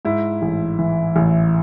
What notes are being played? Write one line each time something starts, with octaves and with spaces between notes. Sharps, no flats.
G#2 E4
A1
E3
A1